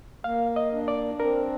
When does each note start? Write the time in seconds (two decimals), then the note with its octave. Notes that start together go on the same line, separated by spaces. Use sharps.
0.24 A#3 F5
0.56 D#5
0.73 D4
0.88 D5
1.20 C4 A#4